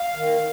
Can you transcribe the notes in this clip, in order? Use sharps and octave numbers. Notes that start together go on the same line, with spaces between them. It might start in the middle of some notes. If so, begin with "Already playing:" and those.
Already playing: F5
D#3